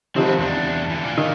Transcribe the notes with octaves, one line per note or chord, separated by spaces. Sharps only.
C3 D#3 F3 C4 B4
E2 D4
D3 E3
F4 D5
D#3